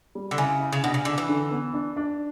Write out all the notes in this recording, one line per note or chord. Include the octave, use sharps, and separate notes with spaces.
G3
D3
C#3 E4
E4
C#3
B2 D4
C#3
D3 D4
E3
D3
B3
D4
D4